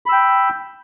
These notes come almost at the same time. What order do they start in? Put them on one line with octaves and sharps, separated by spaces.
B5 E6 G5